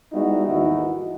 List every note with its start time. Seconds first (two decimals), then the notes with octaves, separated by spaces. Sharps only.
0.13 G3 G#3 B3 D#4 E4 F#4
0.47 G#1 D#2 E3 D#4 E4 F#4